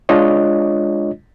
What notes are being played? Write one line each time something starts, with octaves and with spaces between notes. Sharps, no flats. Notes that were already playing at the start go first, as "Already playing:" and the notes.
G#3 D4 F4 C#5 D#5